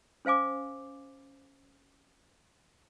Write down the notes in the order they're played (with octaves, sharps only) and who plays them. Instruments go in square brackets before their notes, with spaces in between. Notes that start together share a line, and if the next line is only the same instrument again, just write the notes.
[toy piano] C#4 C5 F5 G#5 D6